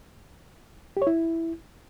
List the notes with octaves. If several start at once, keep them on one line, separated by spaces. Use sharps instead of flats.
G4
C#5
E4